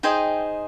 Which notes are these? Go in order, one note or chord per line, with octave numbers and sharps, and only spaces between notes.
D#4 G#4 C5 D#5 G5